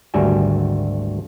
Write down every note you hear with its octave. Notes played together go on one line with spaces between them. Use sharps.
G#1 D2 G3 F#4 E5 G#5